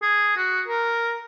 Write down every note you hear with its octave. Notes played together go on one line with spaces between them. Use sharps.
G#4
F#4
A#4